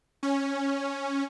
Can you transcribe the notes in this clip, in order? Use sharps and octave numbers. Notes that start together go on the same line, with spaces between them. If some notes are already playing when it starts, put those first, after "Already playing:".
C#4